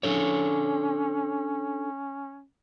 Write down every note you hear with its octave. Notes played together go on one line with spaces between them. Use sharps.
C#4 D4 A4 C#5